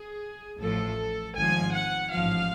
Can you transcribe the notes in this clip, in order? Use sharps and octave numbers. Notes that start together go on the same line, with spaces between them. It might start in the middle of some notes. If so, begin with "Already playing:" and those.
Already playing: G#4
A1 A2 F3 A4
G#1 G#2 F3 G#5
F#5
A1 G#2 F3 F5